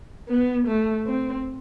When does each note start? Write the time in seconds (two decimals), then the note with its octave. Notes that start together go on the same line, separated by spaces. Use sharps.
0.29 B3
0.67 A3
1.06 C4